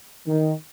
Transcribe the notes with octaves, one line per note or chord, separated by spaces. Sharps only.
D#3